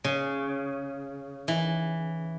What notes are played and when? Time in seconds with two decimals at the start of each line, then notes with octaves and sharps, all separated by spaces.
0.04 C#3
1.48 E3